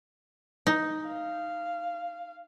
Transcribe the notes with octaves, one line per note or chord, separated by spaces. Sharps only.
D#4
F5